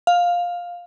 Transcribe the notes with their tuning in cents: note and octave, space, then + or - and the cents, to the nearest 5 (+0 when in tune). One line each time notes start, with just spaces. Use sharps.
F5 +10